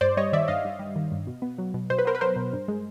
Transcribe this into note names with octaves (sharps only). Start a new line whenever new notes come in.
G2 C5 D5
G3 C#5 D#5
D#3 D5 E5
G2 D#5 F5
G2
G3
D#3
G2
B2
B3
F#3
B2
B2 C5
B4
B3 A#4 C5
B4
F#3 A#4 C5
B2
G2
G#3